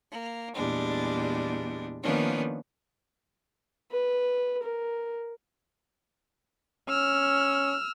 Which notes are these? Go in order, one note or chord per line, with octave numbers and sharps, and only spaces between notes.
A#3
E2 A#2 G3 G#3 D4
D#3 F3 A#3 B3 C#4 D4
B4
A#4
C#4 E6 F6